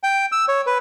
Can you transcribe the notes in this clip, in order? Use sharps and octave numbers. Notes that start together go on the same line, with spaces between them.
G5
E6
C#5
B4